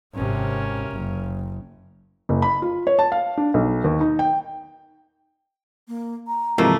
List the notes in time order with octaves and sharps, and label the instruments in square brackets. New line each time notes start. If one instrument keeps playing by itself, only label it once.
[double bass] G#1 C3 [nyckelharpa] C#4 A#4
[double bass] F#1
[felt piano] F#1
B5
F4
C#5
A5
F5
D4
B1
D#2
D#4
G5
[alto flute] A#3
A#5
[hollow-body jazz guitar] G#2 [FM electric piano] C3 E3 F3 [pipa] A3 A#3